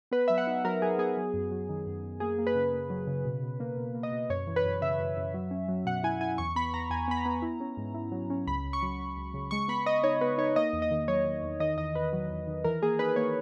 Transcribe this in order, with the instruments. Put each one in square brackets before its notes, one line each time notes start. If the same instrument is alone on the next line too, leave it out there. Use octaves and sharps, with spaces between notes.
[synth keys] B3 B4
F#3 E5
F#5
D#4
F#3 A#4
F#3 G#4
B3 G#4
F#3
F#2
F#3
D#3
F#2
F#2
A#3 G#4
A#3
B4
C#3
A#3
F#3
C#3
B2
B2
A#3
B2
A#3
D#5
B2
F#2 C#5
E3
B4
F#2
C#3 E5
F#2
F#2
F#3
C#4
F#3
B2 F#5
E4 G#5
E4 G#5
E2 C#6
B3 B5
E2 A#5
E2 G#5
B3 B5
A#5
B3
E4
C#4
G#2
E4
F#3
C#4
C#2 B5
C#2
C#6
F#3
F#3
C#2
C#3
G#3 C#6
B3 B5
B3 D#5
D#4 C#5
B3 B4
D#4 C#5
A#3 D#5
E2
D#5
D#3
F#3 C#5
D#3
E2
D#3 D#5
E2 D#5
E2 B4
F#3
E2
D#3
E3 A#4
A#3 G#4
D#4 B4
A#3 C#5